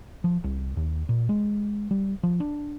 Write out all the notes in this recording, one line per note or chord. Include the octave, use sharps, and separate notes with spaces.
F3
C2
D#2
A#2
G#3
G3
F3
D4